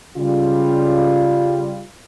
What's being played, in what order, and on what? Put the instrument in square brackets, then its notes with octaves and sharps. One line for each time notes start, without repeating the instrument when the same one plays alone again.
[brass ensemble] C#3 G3 F4